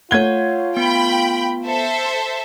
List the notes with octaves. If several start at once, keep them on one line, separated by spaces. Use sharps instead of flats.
A3 F4 C#5 F#5 G#6 G7
B3 G5 B5
A4 C5 E5